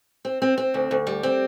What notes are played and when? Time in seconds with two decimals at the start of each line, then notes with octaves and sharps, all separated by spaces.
0.25 C4
0.42 C4
0.58 C4
0.74 D2
0.91 D2
1.07 G3
1.23 C4